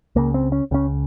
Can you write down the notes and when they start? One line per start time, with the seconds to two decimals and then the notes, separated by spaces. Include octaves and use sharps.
0.16 C#2 C#3 A#3
0.34 C4
0.52 C#4
0.71 C#2 C#3 C#4